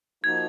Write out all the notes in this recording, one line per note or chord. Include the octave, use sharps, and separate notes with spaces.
F3 A#3 D#4 F#4 G#6